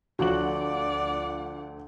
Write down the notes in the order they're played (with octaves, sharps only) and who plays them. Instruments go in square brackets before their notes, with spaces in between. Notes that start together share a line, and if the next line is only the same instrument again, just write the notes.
[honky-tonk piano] D2 F3 F#7 [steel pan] F#4 [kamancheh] D5 F#5